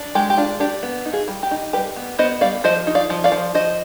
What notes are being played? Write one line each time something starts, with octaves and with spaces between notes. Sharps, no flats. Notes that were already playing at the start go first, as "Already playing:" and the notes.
Already playing: D4
G#3 G4
G4
D4 F4
D4 G4
B3
D#4
F4 G#4
G3
G4
D#4
G3 G4 B4
B3
B3 C5 D#5
G3 D5 F5
F3 C5 D#5
D#4
D5 F5
F3
D5 F5
F3
F3 C5 D#5